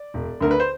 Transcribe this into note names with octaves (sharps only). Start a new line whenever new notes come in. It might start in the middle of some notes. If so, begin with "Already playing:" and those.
Already playing: D5
E1
D2 D3 A#4
B4
C5